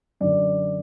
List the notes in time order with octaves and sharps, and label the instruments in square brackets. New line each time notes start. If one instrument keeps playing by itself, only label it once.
[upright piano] F#2 D3 D5